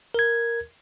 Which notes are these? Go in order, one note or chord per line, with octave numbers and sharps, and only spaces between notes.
A#4 G#6